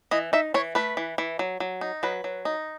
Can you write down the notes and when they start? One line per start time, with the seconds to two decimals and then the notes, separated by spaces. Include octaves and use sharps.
0.11 E3 D#5
0.33 D#4 E5
0.54 E3 C#5
0.75 A3 B4
0.97 E3
1.18 E3
1.39 F#3
1.60 F#3
1.81 D#4
2.03 F#3 B4
2.24 F#3
2.45 D#4